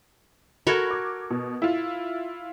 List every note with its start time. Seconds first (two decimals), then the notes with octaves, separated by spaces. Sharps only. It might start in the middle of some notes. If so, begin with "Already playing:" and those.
0.67 F#4 A4 A#4 B5 G#6
0.91 D6
1.30 B2
1.62 E4 F4